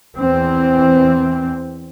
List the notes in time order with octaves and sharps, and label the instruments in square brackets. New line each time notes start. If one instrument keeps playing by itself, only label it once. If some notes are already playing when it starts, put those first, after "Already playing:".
[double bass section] E2 E3 C4